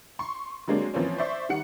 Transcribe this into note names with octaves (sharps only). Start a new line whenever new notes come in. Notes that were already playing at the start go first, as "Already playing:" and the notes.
C6 C#6
D3 F#3 G#3 A#3 C4 D4
E3 F3 A#3 C4 C#4
C5 D5 E5 C#6
D#3 G3 F#5 C#7